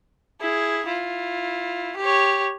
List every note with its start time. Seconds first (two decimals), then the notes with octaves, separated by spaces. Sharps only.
0.41 E4 G#4
0.87 E4 F4
1.97 G4 C#5